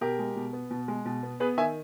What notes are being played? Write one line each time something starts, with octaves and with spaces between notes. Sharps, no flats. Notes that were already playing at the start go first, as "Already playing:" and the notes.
B2 G4 A#4
G#3
B2
B3
B2
G#3
B2
B3
B3 G#4 B4
D#3 E5 G#5